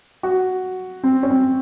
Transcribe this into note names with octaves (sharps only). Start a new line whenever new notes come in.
F#4
C4
C#4
C4